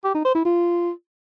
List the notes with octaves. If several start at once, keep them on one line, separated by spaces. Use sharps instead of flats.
G4
D#4
C5
E4
F4